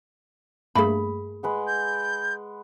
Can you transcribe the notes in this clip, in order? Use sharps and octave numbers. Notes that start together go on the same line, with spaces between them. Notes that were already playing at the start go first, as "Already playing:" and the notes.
G2 A3 A#3 G#4 B5
G#3 B4 F#5
G6